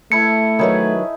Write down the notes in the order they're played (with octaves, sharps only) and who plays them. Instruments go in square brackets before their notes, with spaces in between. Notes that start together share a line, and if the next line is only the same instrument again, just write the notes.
[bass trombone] A3 [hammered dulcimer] E4 A4 [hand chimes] C#7
[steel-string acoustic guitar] D#3 F#3 B4 [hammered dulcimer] D#4 E4 G#5